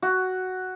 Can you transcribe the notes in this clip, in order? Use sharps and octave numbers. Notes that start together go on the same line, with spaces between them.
F#4